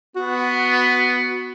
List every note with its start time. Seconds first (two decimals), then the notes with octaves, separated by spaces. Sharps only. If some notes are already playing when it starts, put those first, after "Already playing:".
0.16 B3 F#4